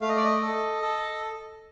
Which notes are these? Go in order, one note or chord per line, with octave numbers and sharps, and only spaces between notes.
A3 F5
D#5
D5
D#5
A4
A4